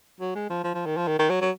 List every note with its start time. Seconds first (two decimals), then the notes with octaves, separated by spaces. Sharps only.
0.20 F#3
0.35 G#3
0.50 F3
0.64 F3
0.74 F3
0.86 D#3
0.97 F3
1.08 D#3
1.19 D#3
1.30 F#3
1.41 F#3